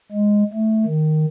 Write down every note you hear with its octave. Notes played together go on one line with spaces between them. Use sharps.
G#3
A3
D#3